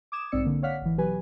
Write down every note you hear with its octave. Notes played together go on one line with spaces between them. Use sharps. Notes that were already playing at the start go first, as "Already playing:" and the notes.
D6 D#6 G#6 E7
B1 G#2 C4 D5 E6 C#7
D3 A#3
C#5 D5 F5 F#5 F6 B6
G#1 E3
B2 F#3 G4 B4 G#5